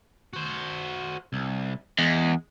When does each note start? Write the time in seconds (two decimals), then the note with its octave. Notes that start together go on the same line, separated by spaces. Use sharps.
0.33 F#4 C5
1.33 C2
1.99 E2 G#3